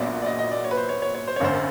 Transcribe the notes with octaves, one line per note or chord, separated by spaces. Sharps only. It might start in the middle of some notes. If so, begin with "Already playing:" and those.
Already playing: A#1 A#2 F#3 B3 D5
D5
D#5
D#5
D5
C#5
B4
C5
C#5
C#5
C#5
C5
C#5
G#1 F#2 D3 C5